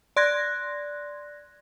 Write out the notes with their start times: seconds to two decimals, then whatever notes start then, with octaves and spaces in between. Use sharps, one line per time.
0.16 D5 C6 F#6 G#6 A#6